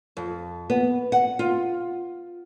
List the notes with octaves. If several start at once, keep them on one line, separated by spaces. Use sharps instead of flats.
F2
B3
F#5
F4